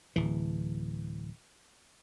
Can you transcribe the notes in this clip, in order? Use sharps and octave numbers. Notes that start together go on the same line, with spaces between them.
D1 E3